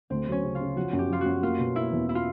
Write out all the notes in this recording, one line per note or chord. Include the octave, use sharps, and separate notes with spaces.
D2 C4
F#3 C#4
C#3
F4
C#3
F3 F#4
F#2
G4
F3 F4
F#2 F#4
A#3 F4
B2
A#3 E4
E2
E4
F4